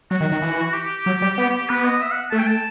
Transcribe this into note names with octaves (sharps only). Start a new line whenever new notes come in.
F#3 F#4
D#3
D#3
E3
G4
F#3
G3
B3
B3 B4
D#5
E5
F#5
A3 A5
G5
A5